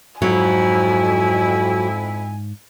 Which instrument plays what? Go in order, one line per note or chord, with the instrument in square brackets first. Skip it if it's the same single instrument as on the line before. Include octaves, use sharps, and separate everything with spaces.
[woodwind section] F2 E4 [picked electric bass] G#2 [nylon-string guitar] F#3 [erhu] G#5